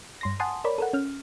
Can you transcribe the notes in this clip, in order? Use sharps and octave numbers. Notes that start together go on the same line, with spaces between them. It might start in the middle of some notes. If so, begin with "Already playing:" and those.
G2 C6 A#6
F#5 G#5 A5 C6 D#6
A#4 C#5 D5 B5
A4 A#4 F#5
C#4 F6